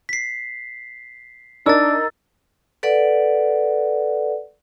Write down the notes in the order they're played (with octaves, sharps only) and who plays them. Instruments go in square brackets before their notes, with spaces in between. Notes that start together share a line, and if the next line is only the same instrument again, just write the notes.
[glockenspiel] B6 C7
[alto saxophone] D4 [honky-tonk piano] D#4 A#4 [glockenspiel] E6 A6
[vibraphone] A4 B4 D5 F#5